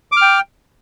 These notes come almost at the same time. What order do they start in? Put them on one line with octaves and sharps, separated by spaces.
D6 F6 G5